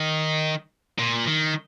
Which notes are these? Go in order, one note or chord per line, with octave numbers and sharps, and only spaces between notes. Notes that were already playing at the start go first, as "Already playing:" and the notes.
Already playing: D#3
A#2
D#3